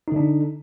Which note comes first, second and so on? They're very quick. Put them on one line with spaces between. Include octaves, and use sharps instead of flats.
D#4 D3 D4